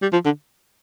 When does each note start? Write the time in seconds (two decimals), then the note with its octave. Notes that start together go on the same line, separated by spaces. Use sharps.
0.02 G3
0.13 F3
0.25 D3